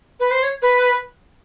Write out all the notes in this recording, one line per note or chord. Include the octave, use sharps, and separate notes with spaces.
B4
C5
C#5
B4